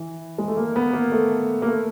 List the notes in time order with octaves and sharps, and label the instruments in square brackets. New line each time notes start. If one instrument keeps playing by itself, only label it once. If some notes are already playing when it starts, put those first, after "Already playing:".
Already playing: [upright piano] E3
G#3
A3
A#3
B3
A#3
A3
A#3
A3